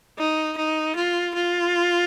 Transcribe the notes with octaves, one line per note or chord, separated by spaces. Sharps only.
D#4
D#4
F4
F4